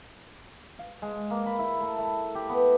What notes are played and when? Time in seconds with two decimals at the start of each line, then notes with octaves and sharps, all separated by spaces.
0.79 F5
1.02 G#3
1.31 A#3
1.46 B5
1.59 E4
1.81 A3
1.98 A3
2.35 G4
2.49 B3